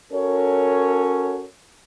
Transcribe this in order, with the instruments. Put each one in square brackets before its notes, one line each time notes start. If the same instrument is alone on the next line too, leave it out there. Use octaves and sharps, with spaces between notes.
[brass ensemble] C#4 F#4 A4 A#4 C#5